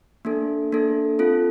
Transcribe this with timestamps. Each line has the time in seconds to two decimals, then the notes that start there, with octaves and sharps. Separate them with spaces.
0.25 A#3 D4 A4
0.72 A#3 D4 A4
1.19 C4 F4 A4